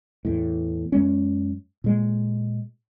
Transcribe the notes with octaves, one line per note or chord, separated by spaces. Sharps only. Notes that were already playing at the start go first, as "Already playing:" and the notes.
E2 A2
F#2 G#3 C#4
A#2 G#3